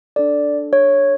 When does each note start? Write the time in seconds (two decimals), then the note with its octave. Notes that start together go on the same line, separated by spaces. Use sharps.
0.16 D4 A4 D5
0.73 C#5